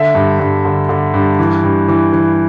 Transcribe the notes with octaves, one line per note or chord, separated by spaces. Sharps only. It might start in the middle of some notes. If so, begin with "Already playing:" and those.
Already playing: D3 E5
G2
G2
D3
D3
G2
E3
G2
E3
E3